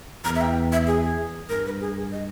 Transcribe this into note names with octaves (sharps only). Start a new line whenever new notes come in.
E2 A#5
E5
G5
E5
G#4
G2 A#4
B4
G#4
D#5